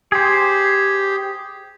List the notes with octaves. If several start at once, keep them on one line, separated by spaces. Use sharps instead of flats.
G4 G#4 C5